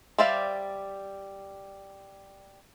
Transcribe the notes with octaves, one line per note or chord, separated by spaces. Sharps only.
G3 C5 D5 E5 F5